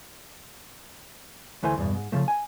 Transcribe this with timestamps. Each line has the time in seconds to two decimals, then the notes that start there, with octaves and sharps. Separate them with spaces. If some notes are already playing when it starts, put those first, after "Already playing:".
1.63 D2 E3 A3 C5 G#5
1.78 E2 G2 B2
1.94 G#2
2.12 C#3 F3 A3
2.28 G#5